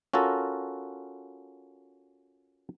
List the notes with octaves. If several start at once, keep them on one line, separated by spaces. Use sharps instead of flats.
C#4 F4 F#4 A4 A#4